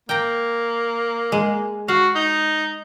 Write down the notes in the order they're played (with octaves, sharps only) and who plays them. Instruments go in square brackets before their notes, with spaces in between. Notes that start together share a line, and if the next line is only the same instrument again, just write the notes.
[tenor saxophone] A#3 [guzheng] G5 A#5
[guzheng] G#3
[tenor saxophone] F#4 [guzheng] F5
[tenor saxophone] D#4